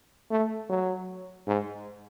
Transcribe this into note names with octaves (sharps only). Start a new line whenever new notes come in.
A3
F#3
G#2